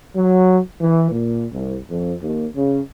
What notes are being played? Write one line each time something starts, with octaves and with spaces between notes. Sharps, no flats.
F#3
E3
A#2
C2
F2
D#2
C#3